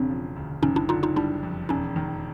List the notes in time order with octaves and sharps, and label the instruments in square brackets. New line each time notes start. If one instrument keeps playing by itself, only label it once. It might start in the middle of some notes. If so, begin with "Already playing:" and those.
Already playing: [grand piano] E1 C#3 [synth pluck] C4 D4
[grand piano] F3
D2
[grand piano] F#1 [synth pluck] C#4 D#4
[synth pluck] D4 E4
[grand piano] D3 [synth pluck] D#4 F4
[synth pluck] D#4 F4
[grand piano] G3 [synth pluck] D4 E4
[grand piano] F2
[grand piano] E1 [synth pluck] C#4 D#4
[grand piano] D#3